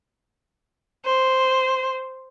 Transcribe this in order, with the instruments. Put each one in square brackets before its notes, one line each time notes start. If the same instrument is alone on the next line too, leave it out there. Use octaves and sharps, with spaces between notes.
[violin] C5